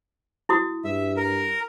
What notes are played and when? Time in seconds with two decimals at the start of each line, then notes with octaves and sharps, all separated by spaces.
0.49 E4 F#4 D#6
0.85 G2 E5
1.17 A#4